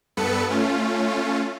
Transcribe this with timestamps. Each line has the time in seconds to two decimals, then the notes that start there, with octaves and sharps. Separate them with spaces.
0.17 G2 B3 A4 B4 C#7
0.49 A3 C#4 F4